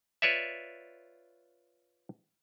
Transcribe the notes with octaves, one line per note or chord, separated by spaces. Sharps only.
F4 B4 C#5 D5 E5